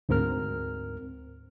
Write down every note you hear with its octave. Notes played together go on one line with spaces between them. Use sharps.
D2 G#2 C4 A#4 F6